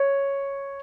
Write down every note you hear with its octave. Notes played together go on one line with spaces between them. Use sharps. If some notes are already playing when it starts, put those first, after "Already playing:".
Already playing: C#5